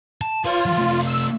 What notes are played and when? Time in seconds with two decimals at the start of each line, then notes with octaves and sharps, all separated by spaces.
0.21 A5
0.45 F4 B4 C#5
0.66 E3 F#3
0.78 C3 A3
1.07 E6